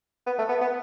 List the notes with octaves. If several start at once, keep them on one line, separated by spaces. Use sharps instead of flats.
B3
A3
B3
B3